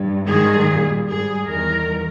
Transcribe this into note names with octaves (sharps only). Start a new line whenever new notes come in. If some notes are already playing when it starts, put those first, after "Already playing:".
Already playing: G2
G#2 D#3 G3 G#4
A#2 G3
G#2 G3 G#4
E2 D#3 G3 A#4